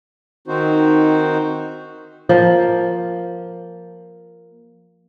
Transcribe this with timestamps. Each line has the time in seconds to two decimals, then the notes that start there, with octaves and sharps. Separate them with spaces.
0.48 D#3 C4 D#4 F#4 C5
2.29 F3 A#3